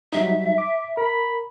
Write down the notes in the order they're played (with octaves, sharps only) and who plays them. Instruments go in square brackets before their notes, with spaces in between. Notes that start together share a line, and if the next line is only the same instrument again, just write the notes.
[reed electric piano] F#3 G3 D#4 [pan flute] E5
[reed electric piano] D6
[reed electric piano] A#4 [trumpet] B5